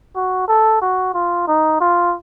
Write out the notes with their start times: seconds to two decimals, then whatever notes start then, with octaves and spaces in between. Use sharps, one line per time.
0.16 F#4
0.48 A4
0.82 F#4
1.14 F4
1.47 D#4
1.81 F4